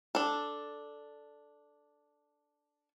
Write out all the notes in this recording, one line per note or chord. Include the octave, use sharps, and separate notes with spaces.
D4 A4